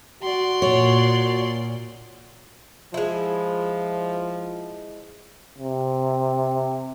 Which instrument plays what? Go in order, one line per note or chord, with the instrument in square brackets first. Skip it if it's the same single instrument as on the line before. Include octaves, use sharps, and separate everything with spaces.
[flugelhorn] F#4 [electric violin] D5 C6
[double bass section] A#2 [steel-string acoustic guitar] C#5
[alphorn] F3 [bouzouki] G#3 E4
[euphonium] C3